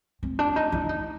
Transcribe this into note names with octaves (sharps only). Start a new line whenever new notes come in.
C4
D4
D#4
E4
D#4